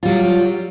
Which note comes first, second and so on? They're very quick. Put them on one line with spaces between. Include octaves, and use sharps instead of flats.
F4 G3 F#3